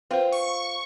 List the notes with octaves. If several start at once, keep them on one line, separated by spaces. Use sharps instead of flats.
C4 F4 B4 C5
C#6